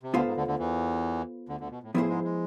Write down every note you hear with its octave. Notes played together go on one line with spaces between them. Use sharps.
C3
D2 D3 B3 F4 A4 C5 F5
G#2
D2 D3
D2 D3
E2 E3
D2 D3
D2 D3
B2
A2
A2 F3 B3 E4 G#4 C5
G#2 G#3
G#3